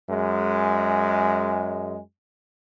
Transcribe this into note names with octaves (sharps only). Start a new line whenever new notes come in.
F#2 G#3